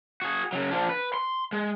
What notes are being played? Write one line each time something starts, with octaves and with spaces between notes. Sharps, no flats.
F#4 G#4
C#3 F#3
F3 D4
B4
C6
G#3